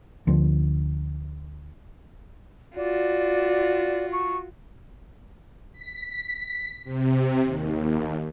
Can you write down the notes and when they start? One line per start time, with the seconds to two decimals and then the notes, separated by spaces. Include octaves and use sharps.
0.27 D2 F3
2.76 F4 F#4 D5
4.12 C#6
5.73 B6
6.84 C3
7.44 D#2